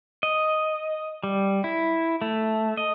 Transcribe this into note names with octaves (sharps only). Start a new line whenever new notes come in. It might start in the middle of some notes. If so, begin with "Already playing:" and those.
D#5
G3
E4
A3
D#5